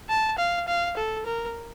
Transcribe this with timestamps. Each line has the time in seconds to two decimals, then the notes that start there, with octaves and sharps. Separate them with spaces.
0.09 A5
0.38 F5
0.68 F5
0.97 A4
1.26 A#4